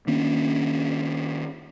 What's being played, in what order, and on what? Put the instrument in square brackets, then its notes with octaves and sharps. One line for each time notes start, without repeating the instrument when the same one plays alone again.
[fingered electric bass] D#3 A#3 C#4 D4